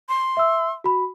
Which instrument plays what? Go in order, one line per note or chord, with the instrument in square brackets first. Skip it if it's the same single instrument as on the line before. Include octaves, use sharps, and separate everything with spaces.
[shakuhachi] C6
[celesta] E5 E6
F#4 B5